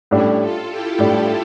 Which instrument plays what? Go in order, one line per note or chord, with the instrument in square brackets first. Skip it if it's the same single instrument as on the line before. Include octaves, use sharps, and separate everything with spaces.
[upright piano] A2 G3 D4 [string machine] C#4 E4
[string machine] F4 A4
E4 G4
[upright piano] A2 G3 D4